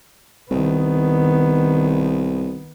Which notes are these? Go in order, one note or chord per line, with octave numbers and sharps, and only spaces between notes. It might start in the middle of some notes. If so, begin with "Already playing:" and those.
C2 D#3 B3